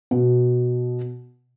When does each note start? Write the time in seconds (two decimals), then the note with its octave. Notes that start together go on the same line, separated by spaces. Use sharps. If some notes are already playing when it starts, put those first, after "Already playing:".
0.11 B2